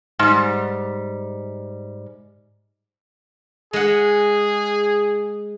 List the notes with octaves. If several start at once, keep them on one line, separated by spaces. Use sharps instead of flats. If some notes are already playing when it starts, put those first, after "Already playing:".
G#2 G3
G#3 G#4 F#5